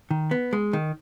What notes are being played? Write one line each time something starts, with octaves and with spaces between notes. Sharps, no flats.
D#3
B3
G#3
D#3